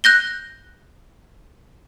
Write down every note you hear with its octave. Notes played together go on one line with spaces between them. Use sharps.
F#6 G6 A#6 G7